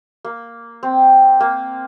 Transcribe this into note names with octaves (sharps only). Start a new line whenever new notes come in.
A#3
C4
A#3